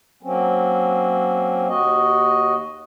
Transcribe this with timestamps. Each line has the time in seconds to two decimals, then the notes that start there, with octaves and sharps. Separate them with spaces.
0.23 F#3 A#3 C4 C#4
1.68 D#2 F#4 D#5